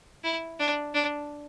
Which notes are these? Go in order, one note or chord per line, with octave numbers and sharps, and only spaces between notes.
E4
D4
D4